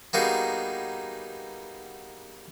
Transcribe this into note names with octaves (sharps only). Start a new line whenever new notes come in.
G3 A#3 B3 D#4 F#4 G#4